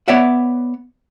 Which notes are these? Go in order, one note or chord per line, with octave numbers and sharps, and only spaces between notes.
B3 C#5 D5 E5 F#5